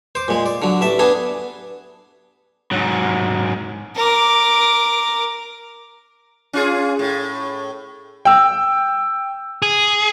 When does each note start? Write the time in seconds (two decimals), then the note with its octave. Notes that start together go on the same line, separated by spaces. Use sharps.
0.15 C5 D6
0.28 A#2 G#3
0.46 D5
0.62 D3 F#3
0.81 A1 E5 A5 D6
0.99 B3 D4 G#4 A4
2.72 G#2 F#3
3.96 A#4 D6
6.53 C#4 F4 G#4
6.99 A2
8.25 G5 E6
9.62 G#4